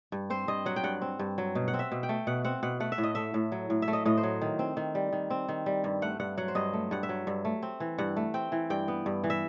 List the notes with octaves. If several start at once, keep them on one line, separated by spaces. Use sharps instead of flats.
G2
C4 C5
G2 D#5
F#3 F#5
G5
G2 F#5
C4
G2
F#3
B2
F#5
C4
E5
B2
G5
A3
B2 F#5
C4 F#5
B2 F#5
A3 F#5
E5
A2
D#5
A3 E5
A2
F#3
A2
E5
A3
D#5
A2 D#5
C5
F#3
D#3
C4
D#3
G3
D#3
C4
D#3
G3
G2
A3 F#5
G2 F#5
F#3 F#5
C5
G2 D#5
A3
G2 F#5
E5
F#3
G2
A3
C4
E3
G2 F#5
A3
C4 G5
E3
G2 G5
B3
G2
E3
E5